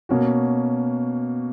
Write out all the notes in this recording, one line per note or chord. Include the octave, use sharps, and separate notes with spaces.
B2 A#3 C#4 F#4